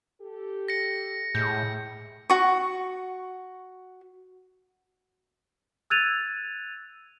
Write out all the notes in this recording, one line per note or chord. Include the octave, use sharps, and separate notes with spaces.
G4 A4
A#6 C#7
A2 G#3 G#4 G6
F#4 C#6
E6 F#6 G#6 A6 D#7 F7